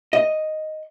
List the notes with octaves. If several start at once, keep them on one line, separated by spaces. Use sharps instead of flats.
D#5